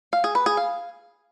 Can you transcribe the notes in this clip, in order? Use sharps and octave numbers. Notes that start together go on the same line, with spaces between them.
F5
G#4
B4
G#4
F5